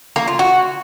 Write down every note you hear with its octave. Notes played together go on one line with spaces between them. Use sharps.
A#3
F4
F#4